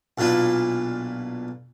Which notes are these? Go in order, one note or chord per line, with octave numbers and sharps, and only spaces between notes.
B1 A#2 D4 E4 F4